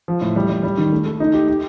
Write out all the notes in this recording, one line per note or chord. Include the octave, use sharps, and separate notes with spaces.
F3
A2
G3
G3
G3
D#3
A3
A3
D#4
G4
G4